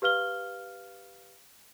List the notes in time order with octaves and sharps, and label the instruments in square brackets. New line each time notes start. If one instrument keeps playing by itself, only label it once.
[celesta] G4 B4 F5 F6 G7